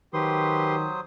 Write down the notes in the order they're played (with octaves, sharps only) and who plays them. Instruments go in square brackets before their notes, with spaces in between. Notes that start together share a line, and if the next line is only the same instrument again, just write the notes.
[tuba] D#3 [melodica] F#3 C5 D#6 [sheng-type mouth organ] G4 B4 C6